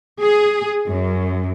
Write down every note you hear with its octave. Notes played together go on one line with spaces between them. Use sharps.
G#4
F#2